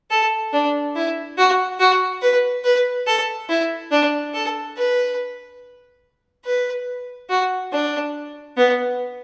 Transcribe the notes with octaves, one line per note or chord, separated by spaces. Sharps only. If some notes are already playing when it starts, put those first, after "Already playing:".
A4
D4
E4
F#4
F#4
B4
B4
A4
E4
D4
A4
B4
B4
F#4
D4
B3